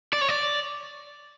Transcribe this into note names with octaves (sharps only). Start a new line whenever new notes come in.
D5
C#5
D5